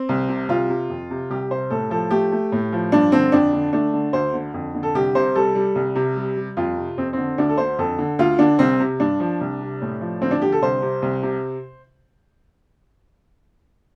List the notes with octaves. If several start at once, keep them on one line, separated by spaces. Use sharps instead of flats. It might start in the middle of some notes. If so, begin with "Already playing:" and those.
Already playing: C4
C2
C3
C2 F4
C3
F2
C3
C2 G4
C3 C5
A2 A4
F3 A4
A3 G4
A3
A2
F3
G2 D4
D3 C4
F2 D4
D3
A3 D4
D3
D2 C5
D3
F2
D3
A4
C2 G4
C3 C5
G3 A4
G3
C2
C3
G3
G3
F2 F4
C3
F2 C4
D3 C4
D2 D4
A4
D3 C5
F2 A4
D3
D2 F4
D3 D4
C2 C4
C3
G2 D4
F3
C2
C3
A2
F3
D2 C4
D4
D3 G4
A4
C2 C5
C3
C2
C3